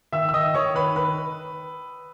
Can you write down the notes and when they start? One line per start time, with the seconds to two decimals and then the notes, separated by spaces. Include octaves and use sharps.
0.12 D#3 E5 E6
0.29 E6
0.33 D#3 D#5 D#6
0.54 D#3 C#5 C#6
0.76 D#3 B4 B5
0.96 B4 B5